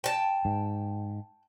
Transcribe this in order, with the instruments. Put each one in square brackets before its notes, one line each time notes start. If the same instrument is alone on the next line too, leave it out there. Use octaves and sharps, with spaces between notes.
[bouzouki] G5 A5
[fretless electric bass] G#2